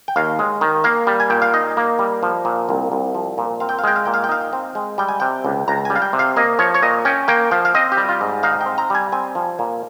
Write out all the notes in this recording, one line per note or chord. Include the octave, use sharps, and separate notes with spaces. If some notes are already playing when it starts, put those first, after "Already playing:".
G5
D#2 F5
G#3
D#3
A#3 F5
G3
G#5
A#2 G5
F5
D#4 D#5
A#3
G3
F3
A#2
C2
C2
F3
A#2
C4 F5
G5
F5
G#3 G5
F5
A#2 G5
F5
G5
D#4 F5
C4
G#3
G3 G5
G#5
C3 G5
C#2
C#2 A#5
G3 G#5
F5
G5
C3
F5
A#3 D#5
F3 C#5
C#5
A#2 D#5
C#4 G5
A#3 G5
F3 F5
F5
C4 D#5
G4
G3
F4
G#2
D#4 F5
G5
C4
A#5
G3 G#5
C4 G#5
F3
A#2